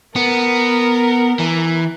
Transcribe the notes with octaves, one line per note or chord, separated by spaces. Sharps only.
B3 A#4
E3